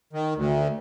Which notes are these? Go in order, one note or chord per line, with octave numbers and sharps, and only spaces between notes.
D#3
D2